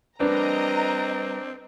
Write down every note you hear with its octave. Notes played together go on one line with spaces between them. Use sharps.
G3 C4 D4 A#4 B4 D#5 A#5